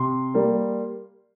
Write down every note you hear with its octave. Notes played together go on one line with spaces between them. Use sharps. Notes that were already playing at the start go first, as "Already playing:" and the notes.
Already playing: C3 C6
G3 A#3